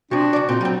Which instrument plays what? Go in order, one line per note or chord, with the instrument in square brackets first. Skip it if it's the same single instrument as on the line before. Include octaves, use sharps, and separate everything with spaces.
[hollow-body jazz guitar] C3 F3 [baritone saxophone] D4 [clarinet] F#4
[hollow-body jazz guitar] C#2 D5
[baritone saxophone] A#2 [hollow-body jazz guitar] C4 D#4
[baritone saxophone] F#3 [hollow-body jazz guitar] G3 C4